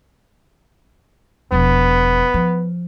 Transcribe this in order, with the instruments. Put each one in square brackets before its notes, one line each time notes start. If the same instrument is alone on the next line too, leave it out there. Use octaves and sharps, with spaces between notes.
[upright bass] E1 F3 [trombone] B3
[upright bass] F3